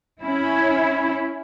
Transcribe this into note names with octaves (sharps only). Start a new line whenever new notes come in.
C#4 E4